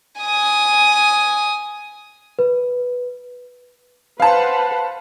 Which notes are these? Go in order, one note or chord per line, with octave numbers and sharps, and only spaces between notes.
G#5 D#6
B4
B4 C5 F5 F#5 A5